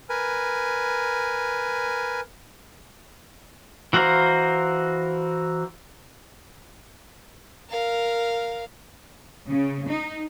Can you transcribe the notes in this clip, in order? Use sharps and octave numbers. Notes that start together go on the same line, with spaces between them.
A#4 B4 G#5
E3 F#4 A#4 C5 F5
A#4 F5
C#3
D#4